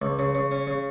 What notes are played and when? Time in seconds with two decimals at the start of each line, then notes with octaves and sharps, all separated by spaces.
0.02 C#2
0.19 C#3
0.35 C#3
0.51 C#4
0.67 C#3